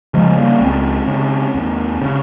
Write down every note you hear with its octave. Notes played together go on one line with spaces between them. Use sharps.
C#3 F3 G#3
G#3
G3 A#3
C#2 G#3 C4
C#3
D#2
C#3